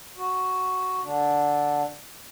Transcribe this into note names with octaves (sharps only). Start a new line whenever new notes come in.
F#4
D3 D4